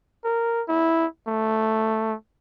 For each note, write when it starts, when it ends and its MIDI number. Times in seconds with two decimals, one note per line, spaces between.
0.25 0.63 70
0.69 1.06 64
1.28 2.14 57